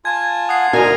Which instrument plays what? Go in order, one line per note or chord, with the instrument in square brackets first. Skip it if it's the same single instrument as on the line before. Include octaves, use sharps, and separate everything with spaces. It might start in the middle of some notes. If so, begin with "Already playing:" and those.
[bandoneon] F4 G#5 A5 [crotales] G#6
[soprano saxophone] F#5 [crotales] D#6 C7
[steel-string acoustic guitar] D2 G#5 [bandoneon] D#4 [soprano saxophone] A#4 [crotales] F6 D#7